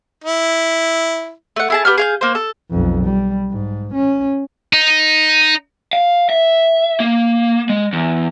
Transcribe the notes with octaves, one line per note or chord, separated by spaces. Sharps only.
E4
A3 F#5
E4 G#4 A5
B3 G4 F#5 F6
G#4 F5 G6
A#3 C5
A4
B1 F2
G3
G#2
C#4
D#4
F5
E5
A#3
G#3
E2